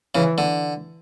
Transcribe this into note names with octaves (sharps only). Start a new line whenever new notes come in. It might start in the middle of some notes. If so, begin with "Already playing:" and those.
C#3 E3
D3